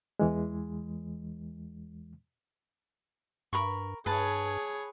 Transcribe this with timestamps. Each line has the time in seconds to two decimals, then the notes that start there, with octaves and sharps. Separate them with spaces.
0.19 E2 E3 G#3
3.53 G2 A#4 B5 C#6
4.06 G2 G#4 B4 C#5 A5